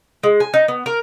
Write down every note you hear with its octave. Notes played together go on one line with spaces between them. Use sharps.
G#3
G#5
D#4
B3
A#4